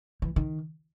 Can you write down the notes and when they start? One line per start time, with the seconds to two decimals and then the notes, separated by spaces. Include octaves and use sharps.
0.22 E3
0.36 D#3